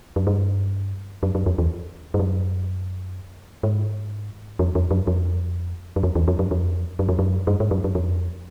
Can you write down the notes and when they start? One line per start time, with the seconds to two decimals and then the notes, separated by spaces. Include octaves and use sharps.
0.16 F#2
0.27 G2
1.23 F#2
1.35 F#2
1.46 F2
1.58 E2
2.14 G2
2.19 F#2
3.63 G#2
4.59 F2
4.75 F2
4.91 F#2
5.07 F2
5.96 F#2
6.03 F2
6.15 E2
6.28 F2
6.39 F#2
6.51 F2
6.99 F#2
7.09 F2
7.19 F#2
7.47 G2
7.60 G#2
7.71 F#2
7.84 F#2
7.95 F2